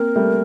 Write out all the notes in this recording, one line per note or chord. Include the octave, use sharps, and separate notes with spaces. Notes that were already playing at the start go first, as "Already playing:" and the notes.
Already playing: A#3 C4 A#4
G3 A3